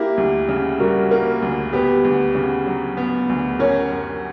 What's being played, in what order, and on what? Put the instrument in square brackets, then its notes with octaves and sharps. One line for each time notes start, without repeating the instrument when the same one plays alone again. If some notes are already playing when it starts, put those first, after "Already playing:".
Already playing: [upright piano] A#3 [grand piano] E4 G4
[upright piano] D2
C#3
[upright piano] G3 [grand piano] F#4 A#4
[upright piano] A#3
D2
[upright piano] B3 [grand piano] G4 B4
[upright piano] D2
C#3
F#3
B3
D2
[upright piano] C#4 [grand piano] A#4 C#5
[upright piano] F#2